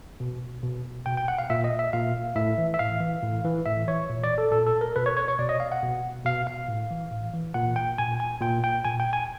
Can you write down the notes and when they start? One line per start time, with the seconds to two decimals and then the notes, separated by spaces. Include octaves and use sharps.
0.20 B2
0.63 B2
1.06 B2 G5
1.17 G5
1.28 F#5
1.38 F5
1.50 A#2 E5
1.64 D#5
1.79 E5
1.93 A#2 F5
2.35 A2 E5
2.58 E3
2.74 E5
2.79 A2 F5
3.00 E3
3.22 A2
3.44 E3
3.66 A2 E5
3.88 E3 C#5
4.10 A#2
4.24 D5
4.38 A4
4.52 A#2 A4
4.66 A4
4.81 A#4
4.96 B2 B4
5.06 C#5
5.17 C#5
5.28 C#5
5.39 B2 D5
5.49 D#5
5.60 F5
5.72 F#5
5.82 B2
6.25 B2 F5
6.47 F5
6.68 A2
6.91 E3
7.11 A2
7.34 E3
7.54 A#2 F#5
7.76 G5
7.98 A#2 G#5
8.20 G#5
8.41 A#2 G5
8.64 G5
8.85 A#2 G#5
9.00 G5
9.13 G#5